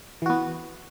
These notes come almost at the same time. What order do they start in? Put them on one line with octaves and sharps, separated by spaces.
E3 F#4 B3